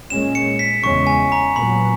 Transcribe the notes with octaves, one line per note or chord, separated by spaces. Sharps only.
A#2 G#3 C#4 E7
C#7
B6
E2 C#3 G#3 C#4 C#6
G#5
A#5
A#2 F#3 B3 B5